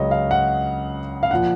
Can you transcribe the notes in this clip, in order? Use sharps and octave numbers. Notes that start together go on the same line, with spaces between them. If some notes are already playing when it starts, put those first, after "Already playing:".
Already playing: C#2 C#3 F#3 C#5 D#5
F5
F#5
F5
A#2 F3 F#5